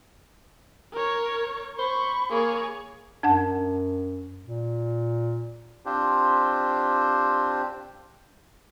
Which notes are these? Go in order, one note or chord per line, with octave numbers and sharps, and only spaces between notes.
A#4 C#5
C5 B5 C#6
A#3 G#4 C#5
F#2 D4 F#5 A5
A#2
C4 D4 F4 G4 C5